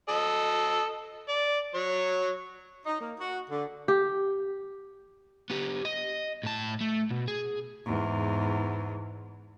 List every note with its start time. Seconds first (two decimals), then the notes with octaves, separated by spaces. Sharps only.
0.09 A4 D#5
1.29 D5
1.75 F#3 C#5
2.86 D#4
3.00 A#3
3.20 F#4
3.50 D3
3.88 G4
5.50 B3 G4
5.85 D#5
6.43 A2 A5
6.81 A3
7.11 B2
7.28 G#4
7.86 E2 G#2